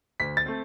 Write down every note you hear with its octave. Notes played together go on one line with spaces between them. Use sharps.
D2 B6
A6
A3 C4